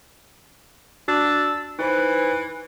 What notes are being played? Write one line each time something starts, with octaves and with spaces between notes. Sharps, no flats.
D4 F#4 E6
E3 D#4 B4 C5 F#6